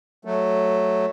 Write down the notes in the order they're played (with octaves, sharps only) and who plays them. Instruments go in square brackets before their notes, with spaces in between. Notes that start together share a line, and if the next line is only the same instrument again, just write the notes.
[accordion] F#3 A3